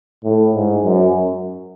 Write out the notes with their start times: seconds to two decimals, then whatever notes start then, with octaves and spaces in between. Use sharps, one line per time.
0.24 A2
0.54 G#2
0.84 F#2